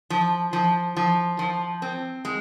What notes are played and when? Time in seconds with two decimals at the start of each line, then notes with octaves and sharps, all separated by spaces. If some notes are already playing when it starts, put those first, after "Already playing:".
0.10 F3
0.53 F3
0.97 F3
1.39 F3
1.82 C4
2.25 G#3